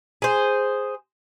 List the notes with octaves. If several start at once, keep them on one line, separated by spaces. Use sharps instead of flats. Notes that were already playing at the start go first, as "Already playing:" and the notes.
G#4 C5